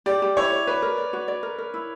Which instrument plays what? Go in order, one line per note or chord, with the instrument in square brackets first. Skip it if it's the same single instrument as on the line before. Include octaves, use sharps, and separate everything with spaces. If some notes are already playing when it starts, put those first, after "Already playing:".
[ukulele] G4 [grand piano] D5
[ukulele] G4
[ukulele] E4 [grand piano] C#5
[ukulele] C#5
[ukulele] F#4 [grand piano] B4
[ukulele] A#4
D5
F#4
D5
A#4
A#4
E4